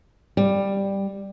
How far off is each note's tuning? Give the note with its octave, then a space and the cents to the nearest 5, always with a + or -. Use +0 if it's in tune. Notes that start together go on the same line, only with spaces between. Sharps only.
G3 +5